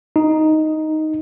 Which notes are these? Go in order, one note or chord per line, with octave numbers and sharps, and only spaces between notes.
D#4